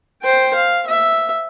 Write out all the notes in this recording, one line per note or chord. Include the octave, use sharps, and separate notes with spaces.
C5 G5
F5
E5